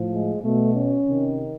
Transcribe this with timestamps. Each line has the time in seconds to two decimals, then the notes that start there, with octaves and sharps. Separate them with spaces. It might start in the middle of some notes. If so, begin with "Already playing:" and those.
Already playing: A2 F3
0.12 G#3
0.43 B2 A3
0.74 C#4
1.06 C3 D#3